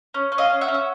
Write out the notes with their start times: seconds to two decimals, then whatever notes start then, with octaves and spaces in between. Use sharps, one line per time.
0.14 C#4
0.32 C#4
0.38 D#5 F5
0.50 C#4
0.61 E5 F#5
0.68 C#4
0.74 E5